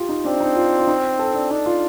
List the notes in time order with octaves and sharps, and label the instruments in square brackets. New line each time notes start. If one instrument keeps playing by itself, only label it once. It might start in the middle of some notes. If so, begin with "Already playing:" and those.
Already playing: [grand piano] F4 G4
D#4
[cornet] C4 [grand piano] D4
[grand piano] D#4
F4
F4
D#4
A4
D4
[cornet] D4 [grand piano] D#4
[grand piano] F4